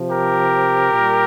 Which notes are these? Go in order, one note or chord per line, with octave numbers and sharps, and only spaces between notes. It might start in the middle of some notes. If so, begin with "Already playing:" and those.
Already playing: C3 F3
G4 A#4
A#2 G3